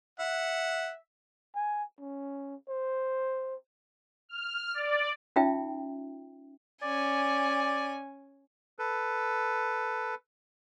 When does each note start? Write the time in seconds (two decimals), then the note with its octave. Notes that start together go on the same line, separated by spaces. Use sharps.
0.19 E5 F#5
1.55 G#5
2.00 C#4
2.69 C5
4.29 F6
4.74 D5
5.36 C#4 D#4 F4 E5 G5
6.83 C#4 D5 G#5
8.79 A4 B4